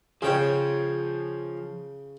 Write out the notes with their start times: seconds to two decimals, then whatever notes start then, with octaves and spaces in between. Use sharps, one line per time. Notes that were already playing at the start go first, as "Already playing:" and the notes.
0.22 C#3 F3 G#4 C#5 G5